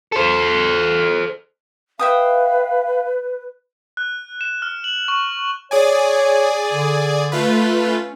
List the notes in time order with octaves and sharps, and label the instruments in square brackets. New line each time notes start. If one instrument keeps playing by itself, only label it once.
[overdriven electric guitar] A4 C5
[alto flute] B4 [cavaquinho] E5 G5 D#6 [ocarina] F5
[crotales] F#6
E7
F6
F#7
C#6
[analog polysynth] G#4 D5 G#5 [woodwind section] C#5
[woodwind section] D3
[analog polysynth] A3 F4 B4
[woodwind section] C#4